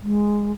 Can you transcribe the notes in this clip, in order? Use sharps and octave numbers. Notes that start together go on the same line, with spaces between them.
G#3